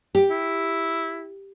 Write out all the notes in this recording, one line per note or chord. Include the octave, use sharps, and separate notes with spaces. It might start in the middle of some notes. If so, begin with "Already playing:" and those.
G4
E4